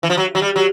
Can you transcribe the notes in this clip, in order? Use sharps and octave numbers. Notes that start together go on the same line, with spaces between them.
E3
F3
F#3
F#3
G3
F#3